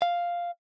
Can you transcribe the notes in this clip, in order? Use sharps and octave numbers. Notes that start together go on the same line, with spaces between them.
F5